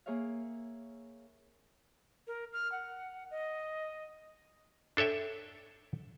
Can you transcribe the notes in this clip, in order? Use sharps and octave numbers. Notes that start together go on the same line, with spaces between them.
A#3 G#4 C#5 E5 F5
A#4
F6
F#5
D#5
D4 A4 C#5 E5 G5